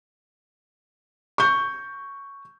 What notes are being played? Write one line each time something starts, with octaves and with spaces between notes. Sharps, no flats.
C#6 G6